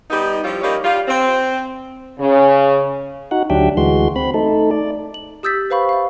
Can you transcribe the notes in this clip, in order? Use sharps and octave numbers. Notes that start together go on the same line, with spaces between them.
G3 B3 D#4
F3 G3 C#4 E4 F4
G3 A#3 C#4 D#4 F4
G3 F4
C4
C#3
D#4 F#4 F#5
D2 F#3 D4 G4 E5 G5
D2 E3 G#3 F#4 C6
C4 B5
A3 D#4 A4
D5
F#7
G4 D#6 E6 G6 A6 B6
B4 C5 F5 B5 C#6
E5 F5